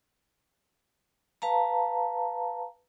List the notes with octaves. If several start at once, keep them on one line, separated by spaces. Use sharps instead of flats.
B4 F5 A5 A#5